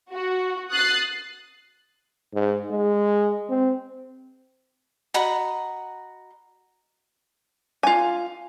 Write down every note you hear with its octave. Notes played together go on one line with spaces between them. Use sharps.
F#4
D#6 F#6 A6 C7
G#2
G#3
C4
F#4 D#5 A#5 B5
F4 G#5